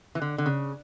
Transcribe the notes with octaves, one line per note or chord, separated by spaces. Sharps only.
E3
D3
D3
C#3